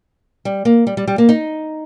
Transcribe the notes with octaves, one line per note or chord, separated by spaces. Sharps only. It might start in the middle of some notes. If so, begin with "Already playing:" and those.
G3
A#3
G3
G3
G3
A#3
D#4